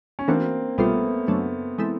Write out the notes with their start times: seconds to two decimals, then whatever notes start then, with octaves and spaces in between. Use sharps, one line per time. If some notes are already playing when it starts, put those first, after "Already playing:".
0.19 C#4
0.28 E3 A3 A#3 C4 D4 F#4
0.78 C2 B2 G3 A3 B3 C4 F4
1.28 F#2 C#3 F#3 A3 D4
1.78 E3 G#3 C4 E4 A4